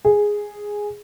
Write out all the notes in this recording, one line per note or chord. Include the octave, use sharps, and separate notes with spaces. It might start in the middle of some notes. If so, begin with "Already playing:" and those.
G#4